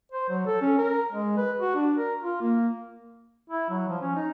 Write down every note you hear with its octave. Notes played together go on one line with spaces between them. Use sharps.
C5
F#3
A4
C#4
A#4
G#3
B4
F#4
D4
A#4
F4
A#3
E4
F#3
F3
C#4
D#4